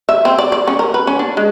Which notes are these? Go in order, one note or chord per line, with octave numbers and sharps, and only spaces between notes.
E5
C4
D5
D5
C#4
A#4
B4
C#4
D4
G#3